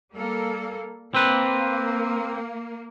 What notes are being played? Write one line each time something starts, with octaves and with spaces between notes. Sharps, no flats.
G3 A#3 A4
A#3 C4 B4